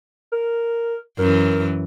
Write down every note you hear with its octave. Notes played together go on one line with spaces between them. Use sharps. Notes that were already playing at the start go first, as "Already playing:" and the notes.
A#4
F#2 E3 A#4